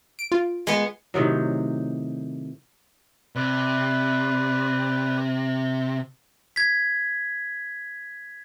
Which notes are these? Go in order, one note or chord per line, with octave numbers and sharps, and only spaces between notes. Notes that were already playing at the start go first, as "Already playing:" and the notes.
D7
F4
G#3 B3
A2 C3 D#3 F#3
C3 B4 D5
G#6 B6